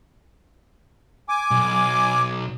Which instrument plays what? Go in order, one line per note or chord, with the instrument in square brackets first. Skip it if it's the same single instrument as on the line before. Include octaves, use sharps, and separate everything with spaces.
[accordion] G#5 D6
[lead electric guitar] B1